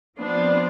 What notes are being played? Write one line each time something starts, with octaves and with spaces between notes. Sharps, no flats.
F3 B3 C4 D4 F4 C5